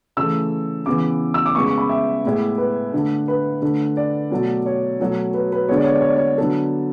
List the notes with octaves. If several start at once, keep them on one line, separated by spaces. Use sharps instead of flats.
C#3 E3 A3 E6
C#3 E3 B3 D6
E6
D6
C#3 G#3 B3 C#6
C#6
B5
E5
A2 G#3 B3
B4
D3 A3
B4
D3 A3
D5
B2 F#3 A3
C#5
B2 F#3 A3
B4
B4
D3 G#3 B3 C#5
D5
C#5
D5
C#5
D5
C#5
D3 F#3 B3 A4